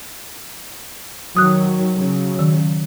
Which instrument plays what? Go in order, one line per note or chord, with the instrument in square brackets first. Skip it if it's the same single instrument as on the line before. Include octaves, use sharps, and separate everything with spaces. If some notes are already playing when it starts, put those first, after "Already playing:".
[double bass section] D#3 F#3 [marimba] D#6 F#6
[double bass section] C#3 F#3
[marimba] D#3